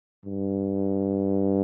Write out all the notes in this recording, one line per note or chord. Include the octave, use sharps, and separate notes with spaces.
G2